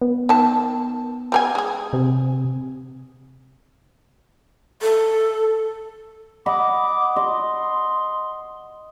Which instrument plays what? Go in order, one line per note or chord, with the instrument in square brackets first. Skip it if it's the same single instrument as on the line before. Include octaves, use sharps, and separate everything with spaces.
[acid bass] B3
[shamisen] D#3 A5
G3 A#4 G#5
G#3 G#4
[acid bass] C3
[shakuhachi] A4
[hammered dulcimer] D#5 F#5 B5 [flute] D6
[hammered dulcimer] D#5 [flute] C6